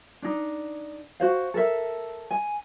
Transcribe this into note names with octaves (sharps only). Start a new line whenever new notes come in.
D4 D#4
F#4 C5 F5
A4 A#4 E5
G#5